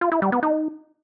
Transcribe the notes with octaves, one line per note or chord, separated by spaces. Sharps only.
F4
E4
G3
B3
D#4